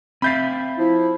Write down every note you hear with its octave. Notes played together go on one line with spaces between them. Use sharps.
C4 E5 F5 B5 G6 A6
F3 E4